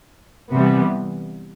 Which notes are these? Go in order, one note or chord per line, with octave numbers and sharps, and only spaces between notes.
C3 E3 G3 B3